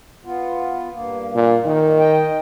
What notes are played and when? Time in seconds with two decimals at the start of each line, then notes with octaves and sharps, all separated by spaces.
0.25 B3 F4
0.93 G2 A#3
1.35 A#2
1.65 D#3 D#4
1.99 D#5 G5